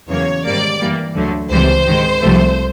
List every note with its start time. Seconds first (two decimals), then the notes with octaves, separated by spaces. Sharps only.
0.09 E2 C#3 F#3 A#3 C#5
0.44 G#2 D#3 G3 A#3 D5
0.80 G2 E3 G3 A#3
1.15 D2 D3 F#3 A3
1.50 C#2 C3 E3 G3 C5
1.85 G#2 D#3 G#3
2.21 C2 C3 F3 A3